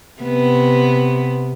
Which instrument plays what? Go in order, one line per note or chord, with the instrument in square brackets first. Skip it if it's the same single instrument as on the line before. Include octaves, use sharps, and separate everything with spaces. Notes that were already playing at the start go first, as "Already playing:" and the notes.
[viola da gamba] C3 B3